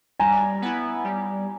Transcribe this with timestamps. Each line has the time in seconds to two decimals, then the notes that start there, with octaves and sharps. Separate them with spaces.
0.20 G3 G#5 A#5
0.62 B3 E4
1.04 G3